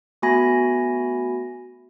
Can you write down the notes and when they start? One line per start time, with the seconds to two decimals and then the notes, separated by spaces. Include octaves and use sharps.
0.22 A3 B3 F#4 G#5 B5 A#6